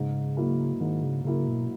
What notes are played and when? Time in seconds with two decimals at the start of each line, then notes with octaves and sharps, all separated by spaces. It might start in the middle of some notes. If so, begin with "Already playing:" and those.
Already playing: G#2 C#3
0.37 F#3 A#3 E4 A#4
0.81 G#2 D#3
1.04 C#3
1.25 C#3 F#3 A#3 E4 A#4
1.48 B2